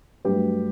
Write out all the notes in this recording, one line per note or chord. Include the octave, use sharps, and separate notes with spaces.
G2 F#3 A3 G4 B4